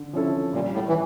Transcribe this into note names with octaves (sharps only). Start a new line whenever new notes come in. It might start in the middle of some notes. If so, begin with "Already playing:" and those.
Already playing: D3
F3 C#4 E4 A4
A#2 G3
A2
E3